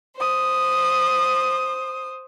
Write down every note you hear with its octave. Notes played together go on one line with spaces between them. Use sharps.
C5 D#6